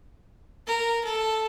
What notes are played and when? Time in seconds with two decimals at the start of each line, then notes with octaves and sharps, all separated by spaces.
0.67 A#4
1.04 A4